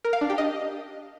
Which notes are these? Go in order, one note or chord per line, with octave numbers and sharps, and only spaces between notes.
A#4
F5
D4
G4
D#5